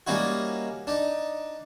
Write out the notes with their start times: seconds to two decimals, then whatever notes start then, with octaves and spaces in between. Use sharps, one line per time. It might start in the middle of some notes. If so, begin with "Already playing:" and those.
0.07 G3 A#3 C#4 D#4 E4 F#4
0.87 D4 D#4